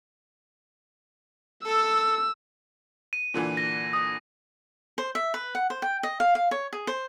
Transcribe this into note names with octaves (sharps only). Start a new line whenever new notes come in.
A4 E6
D#7
A#2 D3 E3
A#6
D#6
C5
E5
B4
F#5
C5
G5
D#5
F5
F5
C#5
G#4
C5